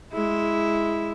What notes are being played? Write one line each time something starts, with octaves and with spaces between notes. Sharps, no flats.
G#3 E4